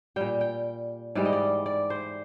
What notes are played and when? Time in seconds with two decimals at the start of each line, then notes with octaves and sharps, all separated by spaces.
0.16 A#2 G3 G5
0.41 G5
1.15 G#2 E3 G3 D5
1.25 D#5
1.33 D5
1.66 D5
1.90 C5